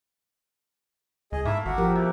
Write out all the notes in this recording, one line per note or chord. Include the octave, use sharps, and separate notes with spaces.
C#2 G#4 D#5
G#2 A3 A#3 E4 E5
G#1 F#4 E5
F3 G4 A#4
B2 E4